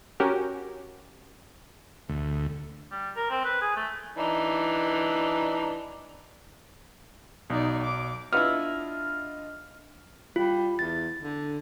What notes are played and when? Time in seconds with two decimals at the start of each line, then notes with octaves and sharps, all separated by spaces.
0.20 C#4 F#4 G4 A#4
2.09 D2
2.92 G3
3.16 A#4
3.30 C4
3.45 B4
3.61 G#4
3.76 A3
4.18 E3 D4 D#4
7.50 B1 D#4 D5
7.83 D6
8.33 B3 D4 E4 F4 D#5 F6
10.36 G3 F4
10.79 E2 A6
11.23 D3